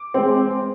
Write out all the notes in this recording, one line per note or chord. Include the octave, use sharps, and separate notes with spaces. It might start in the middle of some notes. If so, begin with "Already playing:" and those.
Already playing: D6
G#3 C4